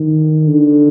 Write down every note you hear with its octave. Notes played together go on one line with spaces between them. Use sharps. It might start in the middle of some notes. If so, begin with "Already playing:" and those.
Already playing: D#3
D3